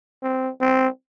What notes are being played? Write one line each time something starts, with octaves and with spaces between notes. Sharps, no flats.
C4
C4